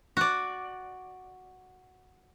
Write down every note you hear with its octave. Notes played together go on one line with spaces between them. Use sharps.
F#4 D5